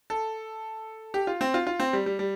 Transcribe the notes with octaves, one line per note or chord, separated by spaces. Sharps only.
A4
G4
F4
C4
F4
F4
C4
G3
G3
G3